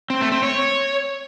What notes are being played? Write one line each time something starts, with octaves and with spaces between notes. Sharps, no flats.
C4
A3
C4
C#5